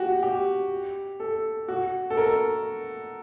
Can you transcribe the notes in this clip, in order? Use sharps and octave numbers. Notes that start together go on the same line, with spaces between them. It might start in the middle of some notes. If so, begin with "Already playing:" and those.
Already playing: F#4 G4
G4
A4
F#4
A4
A#4